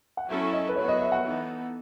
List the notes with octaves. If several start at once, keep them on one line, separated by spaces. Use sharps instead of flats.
F#5
F#3 C#4 E4 A4 E5
D#5
B4
F#3 B3 F#4 C#5
D#5
E5
F#5
E3 B3 D#4 A4